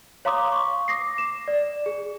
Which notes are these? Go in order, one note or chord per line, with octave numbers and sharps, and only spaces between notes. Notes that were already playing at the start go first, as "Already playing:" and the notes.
C#5 F5 A#5 C6 D6 D#6
C#6
D6 D#6 A#6 C7
E7
D5
G#4